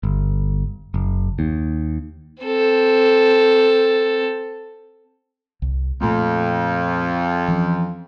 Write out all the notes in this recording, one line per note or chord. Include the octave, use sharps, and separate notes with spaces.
G1
F#1
D#2
C4 A4
C2
F2 A#2 A3 A#3
E3 F3 C#4